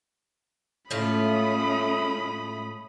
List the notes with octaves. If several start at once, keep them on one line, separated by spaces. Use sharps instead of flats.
A2 G#3 A3 C#4 F4 B5 D#6